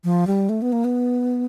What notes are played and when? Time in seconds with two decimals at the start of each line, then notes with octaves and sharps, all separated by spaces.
0.04 F3
0.27 G3
0.49 A3
0.62 B3
0.72 A#3
0.84 B3